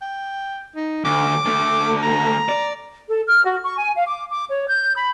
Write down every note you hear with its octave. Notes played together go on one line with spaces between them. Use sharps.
G5
D#4
D2 D6
D2 A3
A#5
D5
A4
F6
F#4
C#6
G#5
F5
D6
D6
C#5
G6
B5